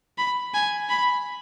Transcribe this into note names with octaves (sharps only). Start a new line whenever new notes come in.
B5
G#5
B5